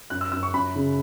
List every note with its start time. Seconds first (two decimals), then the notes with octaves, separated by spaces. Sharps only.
0.10 F#2 F#6
0.21 E6
0.32 F#2 E6
0.43 C#6
0.54 F#2 B5
0.75 C#3